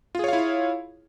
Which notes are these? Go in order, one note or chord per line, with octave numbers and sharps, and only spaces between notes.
E4 F4 G#4 C#5 F5